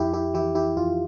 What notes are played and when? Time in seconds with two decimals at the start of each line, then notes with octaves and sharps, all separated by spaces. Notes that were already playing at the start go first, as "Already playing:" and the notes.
Already playing: F2 E4 G4
0.14 E4 G4
0.34 E3 E4 G4
0.55 E4 G4
0.77 F2 F4